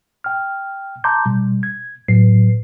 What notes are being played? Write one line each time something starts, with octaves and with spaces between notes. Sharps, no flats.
G5 F6
A5 A#5 C6 D6 G6
B2 G3
G#6
A2 F#3 B4 C7